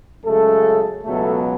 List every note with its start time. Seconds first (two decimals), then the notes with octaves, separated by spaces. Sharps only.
0.24 F#2 C#3 G#3 A3 A4
1.04 C#2 B2 F#3 A3 B3 A4